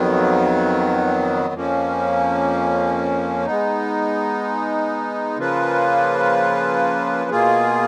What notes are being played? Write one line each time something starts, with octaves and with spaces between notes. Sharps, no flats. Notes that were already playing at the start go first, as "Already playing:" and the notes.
Already playing: F2 D#3 F#3 B3
F2 F3 A#3 C#4
G#3 B3 D#4
C#3 F3 A#3 F4 B4
B2 A#3 F4 G#4